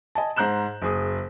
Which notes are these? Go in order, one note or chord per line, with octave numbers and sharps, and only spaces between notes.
D#5 G#5 A5
G#2 C5 A#5 F#6 G6 E7
F#1 G#4 D#6